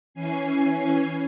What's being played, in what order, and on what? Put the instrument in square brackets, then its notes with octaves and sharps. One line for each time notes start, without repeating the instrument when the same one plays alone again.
[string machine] E3 C#4 G#5 C7